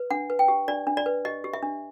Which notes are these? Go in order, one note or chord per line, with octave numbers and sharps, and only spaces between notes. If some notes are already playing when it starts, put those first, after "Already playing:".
Already playing: B4
D4 F#5
B4
G5
G4
D4 D5
D4
D5
B4
G4 D#5
G4
E5
D4